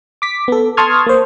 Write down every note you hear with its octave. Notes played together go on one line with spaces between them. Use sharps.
D6 B6
B3 A4
A5 C6 C#6 D#6 F6 G#6
A#3 C5